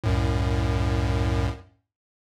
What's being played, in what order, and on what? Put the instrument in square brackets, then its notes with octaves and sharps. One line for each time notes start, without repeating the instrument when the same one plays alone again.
[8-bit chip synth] C2 F#2 A2